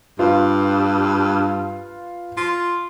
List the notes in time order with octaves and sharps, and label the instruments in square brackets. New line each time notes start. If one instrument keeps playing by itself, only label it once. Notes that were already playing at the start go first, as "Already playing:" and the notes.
[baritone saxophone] G2 [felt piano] F4 B4
[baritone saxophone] F4